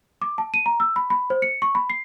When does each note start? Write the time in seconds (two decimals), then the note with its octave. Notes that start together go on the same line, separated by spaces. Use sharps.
0.22 D6
0.38 A5
0.54 D#7
0.66 A#5
0.80 E6
0.96 B5
1.10 B5
1.30 C5
1.42 C#7
1.62 C#6
1.75 B5
1.90 C7